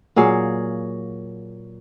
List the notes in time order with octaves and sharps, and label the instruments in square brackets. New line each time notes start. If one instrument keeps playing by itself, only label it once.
[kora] A#2 F#3 G#4 F5